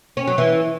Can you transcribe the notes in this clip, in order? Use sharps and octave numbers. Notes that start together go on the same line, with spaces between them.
C#4
F#3
E3